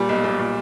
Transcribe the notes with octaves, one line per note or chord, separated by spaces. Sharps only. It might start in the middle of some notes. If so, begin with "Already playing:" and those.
Already playing: A#2 G3
B1
B1
A#2